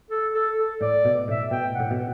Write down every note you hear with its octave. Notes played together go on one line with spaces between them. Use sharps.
A4
A4
A4
A2 D5
B2
A2 E5
B2 G5
A2 F#5
B2
F#5